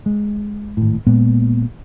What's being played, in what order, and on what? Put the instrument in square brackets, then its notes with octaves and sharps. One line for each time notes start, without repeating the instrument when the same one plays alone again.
[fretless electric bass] G#3
G#1 A2
A#2 G#3 B3